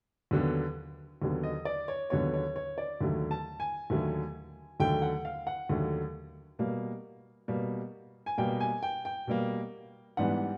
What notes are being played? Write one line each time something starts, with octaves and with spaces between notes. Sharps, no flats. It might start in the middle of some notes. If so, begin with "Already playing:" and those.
D#2 D3 F#3 B3
D#2 D3 F#3 B3
D#5
D5
C#5
D#2 D3 F#3 B3 C#5
C#5
C#5
D5
D#2 D3 F#3 A3
A5
G#5
D#2 D3 F#3 A3
D#2 D3 F#3 A3 G5
F#5
F5
F#5
D#2 D3 F#3 A3
B2 G3 A#3
B2 G3 A#3
G#5
B2 G3 A#3 G5
G#5
G5
G5
B2 G3 A#3
G#2 E3 G3 B3 D4 F#5